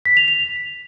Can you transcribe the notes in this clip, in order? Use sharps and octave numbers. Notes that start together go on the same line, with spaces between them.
B6
F7
F7